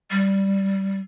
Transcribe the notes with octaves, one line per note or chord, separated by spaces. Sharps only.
G3